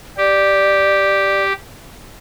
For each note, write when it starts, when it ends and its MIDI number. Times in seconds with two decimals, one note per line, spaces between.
0.17 1.53 67
0.17 1.43 74